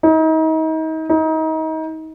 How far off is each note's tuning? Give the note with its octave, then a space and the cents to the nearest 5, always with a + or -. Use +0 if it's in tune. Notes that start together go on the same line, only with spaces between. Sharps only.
D#4 +35
D#4 +30